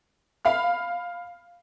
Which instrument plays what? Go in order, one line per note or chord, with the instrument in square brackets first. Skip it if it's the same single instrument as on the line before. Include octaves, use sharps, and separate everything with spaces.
[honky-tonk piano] F5 B5 F6